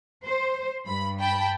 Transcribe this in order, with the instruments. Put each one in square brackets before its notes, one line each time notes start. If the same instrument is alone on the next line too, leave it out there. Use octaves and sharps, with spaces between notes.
[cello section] C5
[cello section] G2 [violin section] B5
[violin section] G5 A5 B5